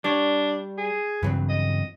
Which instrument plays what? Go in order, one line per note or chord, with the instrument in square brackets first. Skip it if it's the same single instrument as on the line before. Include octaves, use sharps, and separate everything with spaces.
[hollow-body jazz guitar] G3 C#5 [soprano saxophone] D4
[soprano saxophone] G#4
[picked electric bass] G2 C#3 [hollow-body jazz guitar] E3 F#3 C4
[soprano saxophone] D#5